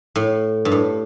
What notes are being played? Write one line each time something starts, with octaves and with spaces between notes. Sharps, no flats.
A2
G2
A2